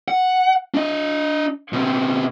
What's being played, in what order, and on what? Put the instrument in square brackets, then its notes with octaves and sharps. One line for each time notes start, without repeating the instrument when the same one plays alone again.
[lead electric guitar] F#5
D4 D#5
B2 C4